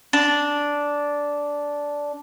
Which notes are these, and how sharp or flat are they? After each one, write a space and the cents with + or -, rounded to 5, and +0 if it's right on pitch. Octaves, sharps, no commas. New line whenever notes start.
D4 -10